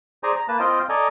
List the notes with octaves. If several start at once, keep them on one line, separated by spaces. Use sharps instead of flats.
G#4 C5 D5 G#5 A#5
A#5
A#3 B4 A5
C4 F4 C5 D#5 G5
A4 D5 D#5 G#5 A#5